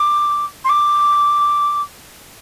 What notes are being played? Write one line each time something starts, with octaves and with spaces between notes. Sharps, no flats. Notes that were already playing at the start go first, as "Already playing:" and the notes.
Already playing: D6
C6
D6